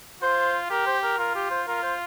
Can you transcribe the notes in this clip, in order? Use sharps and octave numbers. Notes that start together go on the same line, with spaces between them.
F4 C5
G4 A#4
C5
A#4
F4 A#4
G4
C5
F4 A#4
C5